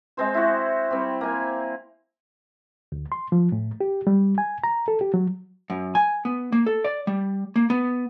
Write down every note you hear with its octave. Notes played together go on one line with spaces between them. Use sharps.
G#3 C4 C5
E4 F#4
G3 C4
A#3 G#5
D2
C6
F3
A2
G4
G3
G#5
A#5
A4
G4
F#3
F#2
G#5
B3
A#3
A4
D5
G3
A#3
B3